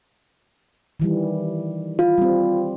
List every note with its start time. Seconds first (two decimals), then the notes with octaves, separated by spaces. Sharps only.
1.00 D#3 E3 G3
1.99 F4
2.18 G3 C4